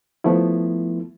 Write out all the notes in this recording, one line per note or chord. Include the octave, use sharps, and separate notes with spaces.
F3 A3 B3 E4